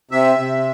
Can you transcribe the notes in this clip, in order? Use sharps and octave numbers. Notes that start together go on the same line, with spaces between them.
C3 E5
C3